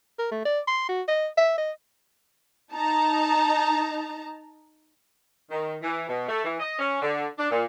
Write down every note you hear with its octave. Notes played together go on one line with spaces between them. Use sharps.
A#4
A3
D5
C6
F#4
D#5
E5
D#5
D#4 A5 A#5
D#3
E3
B2
A3
E3
D#5
C#4
D3
D4
A#2